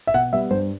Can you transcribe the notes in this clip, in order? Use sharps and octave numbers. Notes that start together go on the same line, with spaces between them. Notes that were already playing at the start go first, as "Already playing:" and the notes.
E5
B2 F#5
G3 B3 E5
G2 C5